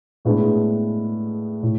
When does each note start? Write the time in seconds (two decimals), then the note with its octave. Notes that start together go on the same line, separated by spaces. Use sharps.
0.25 A2 G#3 B3 D4 G#4
1.63 A2